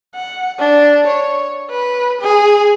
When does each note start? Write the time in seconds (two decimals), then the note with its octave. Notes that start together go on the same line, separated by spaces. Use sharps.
0.15 F#5
0.59 D4
1.07 C#5
1.70 B4
2.21 G#4